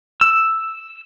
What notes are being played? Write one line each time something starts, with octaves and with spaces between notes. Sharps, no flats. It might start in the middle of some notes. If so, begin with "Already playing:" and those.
E6